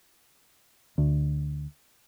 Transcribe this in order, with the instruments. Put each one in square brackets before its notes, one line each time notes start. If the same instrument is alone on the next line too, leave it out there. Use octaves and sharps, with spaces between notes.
[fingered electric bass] D2